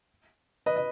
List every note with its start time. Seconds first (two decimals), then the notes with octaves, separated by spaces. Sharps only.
0.66 B4 D#5
0.76 D#5